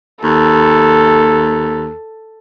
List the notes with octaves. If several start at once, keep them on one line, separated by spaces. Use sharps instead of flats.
D#2 A4